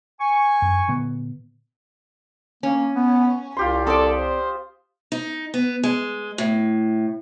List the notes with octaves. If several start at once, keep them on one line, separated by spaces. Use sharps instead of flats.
G#5 C#6
F#2
A#2 D3 B3
A#3 C#4
B3
C2 F4 G4 C6
C4 A4 D5 D#6
C5
D#4
B3
G#3
A2